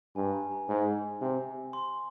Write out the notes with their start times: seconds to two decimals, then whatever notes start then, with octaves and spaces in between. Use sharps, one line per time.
0.16 G2 G#5
0.33 A#5
0.51 A#5
0.68 G#2
1.21 C3
1.73 C6